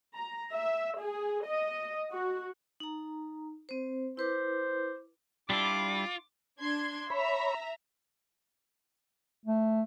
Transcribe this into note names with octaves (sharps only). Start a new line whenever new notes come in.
A#5
E5
G#4
D#5
F#4
D#4 A#5
C4 C5
E4 B4 C5 D6
G3 D4 E4 F4 D6
D4 C6 G#6
C#5 E5 A#5 B5
A3